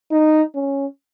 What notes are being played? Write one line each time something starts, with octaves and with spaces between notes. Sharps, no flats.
D#4
C#4